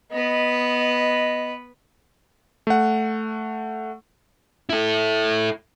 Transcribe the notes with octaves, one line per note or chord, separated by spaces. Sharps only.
B3 B4 D#5
A3 F#5
E4 A4